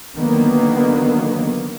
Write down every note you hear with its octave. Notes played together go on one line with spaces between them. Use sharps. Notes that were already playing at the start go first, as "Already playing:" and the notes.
D3 D#3 F#3 A#3 B3